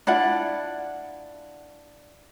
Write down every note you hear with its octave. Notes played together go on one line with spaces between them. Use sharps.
D4 E4 F4 F#5